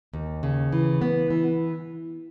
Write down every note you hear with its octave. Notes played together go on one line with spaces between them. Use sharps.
D#2
C#3
E3
B3
E3